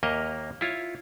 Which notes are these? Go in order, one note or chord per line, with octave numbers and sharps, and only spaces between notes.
D#2 A#3 A#4 D#5 E5
E4 F4 C#5